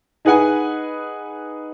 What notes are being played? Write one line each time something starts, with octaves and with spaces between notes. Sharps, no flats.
D#4 G#4 B4 F#5 G#5